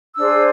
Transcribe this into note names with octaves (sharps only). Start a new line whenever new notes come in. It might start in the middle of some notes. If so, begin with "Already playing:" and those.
D4 G#4 C5 E6